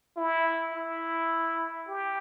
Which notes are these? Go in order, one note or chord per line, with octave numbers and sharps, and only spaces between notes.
E4
E4
G4